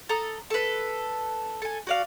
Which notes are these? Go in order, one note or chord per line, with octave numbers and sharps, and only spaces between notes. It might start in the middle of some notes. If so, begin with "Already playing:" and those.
A4 A#5 D#6
A4 B4
A4 G#5
F#4 D5 F5